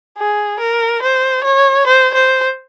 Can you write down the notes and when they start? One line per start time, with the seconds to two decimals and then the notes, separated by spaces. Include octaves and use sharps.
0.18 G#4
0.60 A#4
1.02 C5
1.44 C#5
1.87 C5
2.14 C5